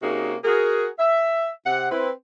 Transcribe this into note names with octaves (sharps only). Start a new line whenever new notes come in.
C3 A#3 C#4 D#4 F#4 G#4
F#4 G#4 A#4
E5
C3 F#5
C4 E4 B4